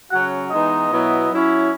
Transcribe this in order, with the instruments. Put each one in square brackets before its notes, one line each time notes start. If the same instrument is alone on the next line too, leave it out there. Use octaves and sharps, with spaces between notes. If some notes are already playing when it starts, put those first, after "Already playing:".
[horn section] C#3 F#3 C#4 F#4 [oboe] F#5
[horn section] E3 G#3 B3 D#4 [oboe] D#5
[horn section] B2 F#3 B3 E4
F#3 C#4 E4